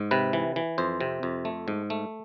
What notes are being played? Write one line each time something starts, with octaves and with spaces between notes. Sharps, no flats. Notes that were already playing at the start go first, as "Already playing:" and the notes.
Already playing: G#2
C3 B4
E3
E3
F2 C5
C3
F2
A3
G#2
A3